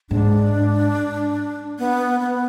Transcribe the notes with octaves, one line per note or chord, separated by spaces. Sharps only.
G#2 D4
B3
B3